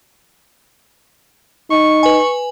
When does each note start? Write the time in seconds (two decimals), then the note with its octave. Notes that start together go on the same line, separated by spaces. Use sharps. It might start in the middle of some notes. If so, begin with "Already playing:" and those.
1.70 D#4 C#6
2.03 B4 G#5